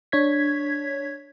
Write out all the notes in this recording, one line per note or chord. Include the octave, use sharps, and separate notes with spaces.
D4 C#5 G#6 B6